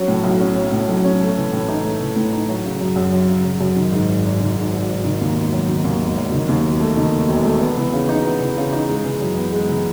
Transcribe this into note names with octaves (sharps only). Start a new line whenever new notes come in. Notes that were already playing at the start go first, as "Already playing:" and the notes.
Already playing: F#3 C#4
A2
B1
C#4
F#3
A2
B1
C#4
A3
E3
A2
D#4
A3
E3
A2
D#4
F#3
C#3
F#2
F#2
F#3
C#3
F#2
F#2
D#3
G#2
G#1
G#1
D#3
G#2
G#1
G#1
D#3
D#2
E1
F#3
D#3
D#2
E1
F#3
D#3
D#2
E1
A3
D#3
D#2
E1
A3
B3
E3
C#3
D#4
B3
E3
C#3
D#4
G#3
E3
F#2
B3
G#3
E3